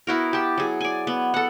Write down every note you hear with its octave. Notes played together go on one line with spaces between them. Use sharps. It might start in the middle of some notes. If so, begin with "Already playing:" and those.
B3 E4 F#4 A#4
G4 A5
F#3 G#4
D5 G#5
B3
A4 F#5